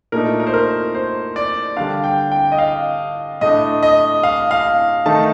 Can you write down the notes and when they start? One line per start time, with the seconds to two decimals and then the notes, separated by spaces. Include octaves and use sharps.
0.12 A#2 A3 D#4 A#4
0.40 A#4
0.47 C5
0.54 A#4
0.95 C5
1.36 D5
1.77 D3 G3 D4 F5
2.04 G5
2.32 G5
2.52 D#5
2.58 F5
3.41 A2 A3 D4 D#5
3.83 D#5
4.23 F5
4.51 F5
5.06 D#3 A3 D#4 A5